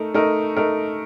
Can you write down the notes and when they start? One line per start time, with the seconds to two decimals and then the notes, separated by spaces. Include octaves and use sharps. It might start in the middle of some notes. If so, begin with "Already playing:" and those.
Already playing: A3 D#4 A#4
0.14 A3 D#4 A#4
0.56 A3 D#4 A#4